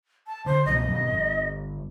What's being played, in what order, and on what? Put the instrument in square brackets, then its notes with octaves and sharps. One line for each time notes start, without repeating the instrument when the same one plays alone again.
[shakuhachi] A5
[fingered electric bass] D3 [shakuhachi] C5
[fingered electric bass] C2 B2 F3 [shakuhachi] D#5
[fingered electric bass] G2 B2 F3
G1